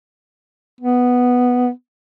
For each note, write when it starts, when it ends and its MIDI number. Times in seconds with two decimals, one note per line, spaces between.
0.81 1.70 59